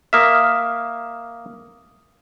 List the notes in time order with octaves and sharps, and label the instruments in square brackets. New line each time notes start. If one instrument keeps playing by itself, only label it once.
[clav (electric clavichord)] A#3 E5 [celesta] D#6 F6